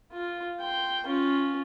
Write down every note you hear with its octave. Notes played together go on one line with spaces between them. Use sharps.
F4
G5 C6
C#4 F4